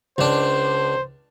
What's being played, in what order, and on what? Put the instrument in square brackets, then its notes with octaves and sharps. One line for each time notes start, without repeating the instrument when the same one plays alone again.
[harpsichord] C#2 D4 [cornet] C5